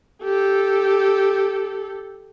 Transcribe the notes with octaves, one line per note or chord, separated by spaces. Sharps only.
G4 A4